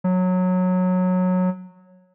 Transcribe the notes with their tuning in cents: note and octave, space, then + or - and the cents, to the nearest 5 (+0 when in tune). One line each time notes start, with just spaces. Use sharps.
F#3 -15